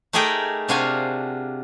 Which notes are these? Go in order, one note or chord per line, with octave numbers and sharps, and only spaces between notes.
A3 D#4 G4 G#4 A#4 G5
C3 D4 F4 F#4 F5 G#5